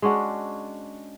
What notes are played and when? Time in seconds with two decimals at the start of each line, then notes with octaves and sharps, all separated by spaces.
0.02 G#3 C#4 D4 F#4